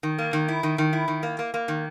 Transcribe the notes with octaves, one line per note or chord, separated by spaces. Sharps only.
D#3
A#3
D#3
E4
D#3
D#3
E4
D#3
A#3
A#3
A#3
D#3